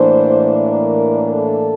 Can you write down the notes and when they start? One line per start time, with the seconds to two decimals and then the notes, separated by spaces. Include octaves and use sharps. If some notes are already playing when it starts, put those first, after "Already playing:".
Already playing: A2 E3 A#3 D4 C5
0.69 A#4
1.31 A4